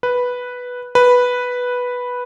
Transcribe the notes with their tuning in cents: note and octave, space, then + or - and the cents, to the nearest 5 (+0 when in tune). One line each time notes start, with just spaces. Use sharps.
B4 -5
B4 -5